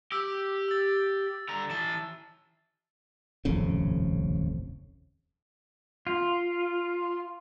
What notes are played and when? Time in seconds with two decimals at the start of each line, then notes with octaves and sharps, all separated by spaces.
0.12 G4 E6
0.69 E6 A6
1.49 D3 A#5
1.70 E3 A5 A6
3.45 D#1 A1 F2 C#3
6.07 F4